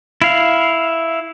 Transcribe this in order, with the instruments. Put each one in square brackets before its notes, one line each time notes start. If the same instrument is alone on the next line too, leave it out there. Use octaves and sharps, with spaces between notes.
[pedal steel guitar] E4 F5